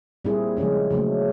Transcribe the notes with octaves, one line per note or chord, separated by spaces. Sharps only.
A#2 G3 C4 E4 G#4
C#3 F3 G#3 C#4
C#3 F#3 A3